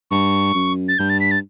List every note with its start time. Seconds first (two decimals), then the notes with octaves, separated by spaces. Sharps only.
0.11 G2 C#6
0.54 F#2
0.88 A6
0.99 G2 G6
1.10 A6
1.21 B6
1.31 A6